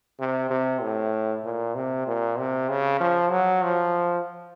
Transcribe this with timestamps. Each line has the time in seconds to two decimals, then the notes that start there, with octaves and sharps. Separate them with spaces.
0.20 C3
0.51 C3
0.82 A2
1.45 A#2
1.75 C3
2.07 A#2
2.38 C3
2.69 C#3
3.00 F3
3.31 F#3
3.63 F3